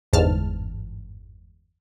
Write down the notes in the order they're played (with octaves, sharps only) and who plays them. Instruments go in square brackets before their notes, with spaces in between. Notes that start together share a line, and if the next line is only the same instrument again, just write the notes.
[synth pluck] G1 E2 G#2 A5 F6